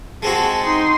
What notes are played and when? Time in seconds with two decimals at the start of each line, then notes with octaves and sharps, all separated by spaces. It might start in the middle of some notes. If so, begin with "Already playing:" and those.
0.22 G#3 C4 F#4 A5
0.63 D#4 C6